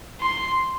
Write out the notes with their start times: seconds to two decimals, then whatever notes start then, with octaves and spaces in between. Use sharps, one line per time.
0.20 C6